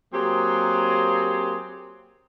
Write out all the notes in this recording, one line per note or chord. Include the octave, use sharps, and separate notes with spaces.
F#3 A#3 C4 G4 G#4